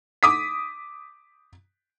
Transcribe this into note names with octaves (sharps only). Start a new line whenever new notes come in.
D6 D#6 B6